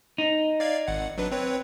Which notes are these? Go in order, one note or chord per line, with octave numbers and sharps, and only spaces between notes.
D#4
D5 F5 G#6
G#1 F#5
F#3 D4 B4
C4 B4 C#5